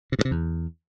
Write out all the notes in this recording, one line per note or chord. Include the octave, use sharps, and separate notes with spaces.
C3
G2
C3
E2